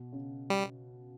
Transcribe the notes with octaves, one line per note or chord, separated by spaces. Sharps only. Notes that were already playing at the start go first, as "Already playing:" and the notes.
Already playing: B2
C#3
G3